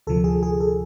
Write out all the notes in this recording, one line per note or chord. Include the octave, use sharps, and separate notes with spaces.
D2 C3 F3 A4
G#4
G#4
A4